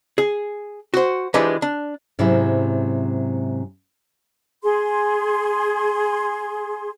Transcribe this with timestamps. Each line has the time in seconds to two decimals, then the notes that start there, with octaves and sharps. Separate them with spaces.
0.18 G#4
0.94 F#4 C5
1.34 E3 F3 G#3 D4 G4 B4
1.62 D4
2.19 G#2 C3 F#3 C4 C#4 E4
4.63 G#4 C6